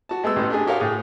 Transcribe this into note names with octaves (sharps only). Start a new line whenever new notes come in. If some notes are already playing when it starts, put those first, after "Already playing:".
F#4 A5
G#3 A3 B3 E6
A1 A2 B3 A4
D4 G4 G#4 G#5
F#4 G4 A#4 C#5 F5
A2 G#4